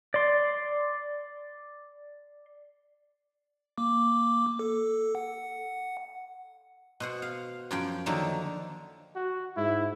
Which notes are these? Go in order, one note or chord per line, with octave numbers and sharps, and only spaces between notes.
D5 C6
A#3 D6
A4
F#5
B2 C5 F#5
F5
F#2 F3 G5
D3 D#3 F3 F#3 A#3
F#4
G#2 E4